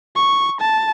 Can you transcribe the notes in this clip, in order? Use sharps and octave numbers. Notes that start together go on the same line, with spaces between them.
C#6
A5